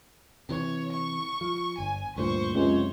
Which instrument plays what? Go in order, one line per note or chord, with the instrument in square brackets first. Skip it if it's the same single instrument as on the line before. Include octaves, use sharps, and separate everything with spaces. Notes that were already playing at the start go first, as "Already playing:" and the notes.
[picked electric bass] C3 E3 [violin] C#5
[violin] C#6
[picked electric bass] F3
[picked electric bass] G1 [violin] G#5
[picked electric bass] D2 G2 A#2 [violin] C5 C#6
[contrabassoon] C#2 [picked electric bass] F#2 C3 [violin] C5 C#5